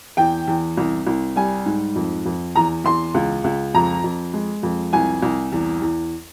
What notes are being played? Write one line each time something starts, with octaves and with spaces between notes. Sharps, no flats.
E2 G5
E2
C2
C2
G3 G#5
G#2
F2
F2
E2 A#5
E2 C6
C#2
C#2
F2 A#5
F2
G#3
F2
C2 G#5
C2
E2
E2